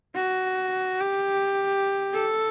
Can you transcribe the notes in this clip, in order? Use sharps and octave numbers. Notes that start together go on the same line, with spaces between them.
F#4
G4
A4